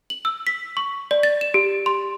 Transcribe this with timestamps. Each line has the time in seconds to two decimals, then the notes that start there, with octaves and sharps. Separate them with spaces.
0.10 F#7
0.25 E6
0.47 B6
0.77 C#6
1.11 D5
1.23 A6
1.41 E7
1.54 G4
1.86 C6